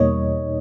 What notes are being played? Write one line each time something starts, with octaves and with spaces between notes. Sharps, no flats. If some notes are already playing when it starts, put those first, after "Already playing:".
Already playing: E2 B2 G3 A#3 D#4 C#5 D#5